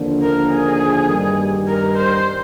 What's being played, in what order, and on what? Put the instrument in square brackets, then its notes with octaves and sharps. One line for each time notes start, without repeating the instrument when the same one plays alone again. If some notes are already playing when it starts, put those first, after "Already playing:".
Already playing: [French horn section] D#2 D3 F3 A#3 D4
[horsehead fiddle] A#4
G#4
[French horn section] G2 D#3 G3
[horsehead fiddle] A#4
C5